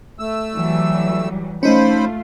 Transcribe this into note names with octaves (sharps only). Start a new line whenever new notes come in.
A3 E6
E3 F#3 G3
F3 A3 C#4 D#4 F4 C5 B5